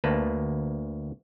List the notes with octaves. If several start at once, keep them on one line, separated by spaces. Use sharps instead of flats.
D2 A#3 B4 A5